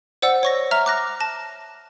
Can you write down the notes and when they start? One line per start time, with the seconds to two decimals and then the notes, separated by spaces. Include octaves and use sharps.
0.22 C5 D5 F#5 E6
0.43 C#5 C#6 A#6
0.71 E5 A#5 F6
0.86 D6 F#6 A#6
1.20 A5 A#6